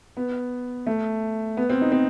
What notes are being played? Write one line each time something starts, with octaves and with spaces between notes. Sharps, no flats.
B3
A3
B3
C4
D#4
C4